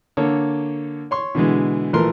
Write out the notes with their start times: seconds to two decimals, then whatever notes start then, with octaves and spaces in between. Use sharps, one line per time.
0.17 D3 A#3 A4 C#5
1.11 C#5 C6 C#6
1.35 B2 D3 E3 G#3
1.93 A#1 E3 F3 A3 A#4 C6